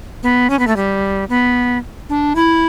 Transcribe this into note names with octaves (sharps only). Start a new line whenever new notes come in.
B3
C#4
B3
A3
G3
B3
D4
E4